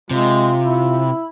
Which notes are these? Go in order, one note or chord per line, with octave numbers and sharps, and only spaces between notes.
C3 G#3 F4
E4